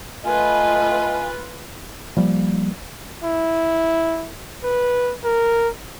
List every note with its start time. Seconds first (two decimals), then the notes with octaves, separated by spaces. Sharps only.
0.25 A3 F4 B4 D#5 G#5
2.17 F3 G3 A#3
3.24 E4
4.64 B4
5.24 A#4